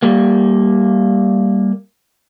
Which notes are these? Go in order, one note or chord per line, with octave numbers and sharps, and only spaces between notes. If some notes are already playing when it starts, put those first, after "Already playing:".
G3 A#3